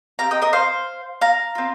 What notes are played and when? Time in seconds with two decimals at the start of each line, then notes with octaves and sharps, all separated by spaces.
0.19 C4 G4 F5 A#5
0.31 D#5 G5
0.42 A#4 D#5
0.53 C5 F5
1.21 F5 A#5
1.55 C4 F4